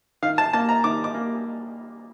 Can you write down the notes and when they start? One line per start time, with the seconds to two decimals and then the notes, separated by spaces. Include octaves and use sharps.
0.22 D#3 F5
0.38 A5
0.53 A#3 A5
0.69 A#5
0.84 D#3 D6
1.04 D6
1.14 A#3